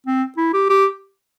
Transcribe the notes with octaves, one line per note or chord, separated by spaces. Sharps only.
C4
E4
G4
G4